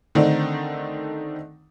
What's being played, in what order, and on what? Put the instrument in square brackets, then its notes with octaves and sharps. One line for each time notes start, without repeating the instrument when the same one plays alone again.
[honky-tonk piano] D3 D#3 A3 C4 D4 D#4